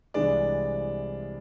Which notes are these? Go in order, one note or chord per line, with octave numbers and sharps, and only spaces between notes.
C2 C3 E3 G#3 D4 D5